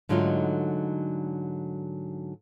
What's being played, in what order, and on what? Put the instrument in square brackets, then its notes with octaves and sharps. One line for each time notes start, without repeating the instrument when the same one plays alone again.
[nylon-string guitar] G#2 D3 F#3 A3 D#4 F4